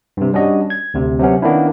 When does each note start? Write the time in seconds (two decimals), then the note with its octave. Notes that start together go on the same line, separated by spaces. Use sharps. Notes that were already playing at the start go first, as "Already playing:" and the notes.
0.17 G2 C3
0.33 G3 C#4 D4 F#4 D#5
0.70 G#6
0.94 D2 C3
1.19 C3 F#3 B3 C#4
1.42 D#3 A#3 B3 C#4 D4 E4